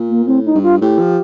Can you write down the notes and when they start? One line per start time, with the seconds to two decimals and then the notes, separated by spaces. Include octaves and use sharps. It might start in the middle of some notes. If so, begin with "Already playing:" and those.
Already playing: A#2
0.09 A#3
0.26 A2 C4
0.45 D#4
0.55 G2
0.63 F4
0.81 A2 G4
0.99 F3